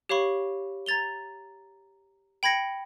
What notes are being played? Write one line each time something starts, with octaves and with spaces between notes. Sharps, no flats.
G4 C#5 F5 B5 C#6
A#5 G#6 A6 F7 G7
G5 B5 G#6 A#6 C#7